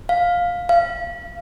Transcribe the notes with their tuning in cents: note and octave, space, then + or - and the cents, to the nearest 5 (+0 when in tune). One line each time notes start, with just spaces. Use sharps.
F5 +10
F5 -25